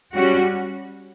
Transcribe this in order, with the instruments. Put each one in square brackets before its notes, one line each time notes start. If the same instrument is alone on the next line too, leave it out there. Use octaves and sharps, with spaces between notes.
[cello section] G3 C#4 F#4